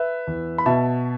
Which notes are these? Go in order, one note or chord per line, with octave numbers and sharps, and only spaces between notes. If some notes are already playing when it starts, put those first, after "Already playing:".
Already playing: B4 E5
E2
B5
B2 E5 A5